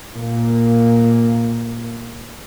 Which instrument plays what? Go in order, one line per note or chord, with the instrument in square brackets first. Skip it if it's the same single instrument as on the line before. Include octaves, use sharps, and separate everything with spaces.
[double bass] A#2 A#3